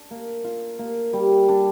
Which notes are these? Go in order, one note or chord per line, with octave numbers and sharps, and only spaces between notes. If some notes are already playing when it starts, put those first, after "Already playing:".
Already playing: D4
A#3
F4
A#3
G3
D4